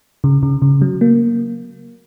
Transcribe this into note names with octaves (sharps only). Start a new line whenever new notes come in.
C#3
C#3
C#3
F#3
A#3